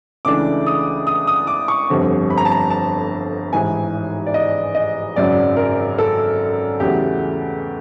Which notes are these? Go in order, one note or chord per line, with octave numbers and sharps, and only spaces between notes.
C#2 C#3 E3 A3 D4 D6
D#6
D#6
D#6
D6
C#6
G1 F2 D3 G3 C4
B5
A#5
A5
A#5
A5
A1 G#2 E3 G#5
D5
D#5
D#5
G#1 F#2 C#3 F#3 D5
A#4
A4
E2 C#3 F#3 A3 G4